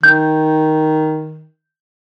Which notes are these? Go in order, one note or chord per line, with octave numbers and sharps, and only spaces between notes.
D#3 G6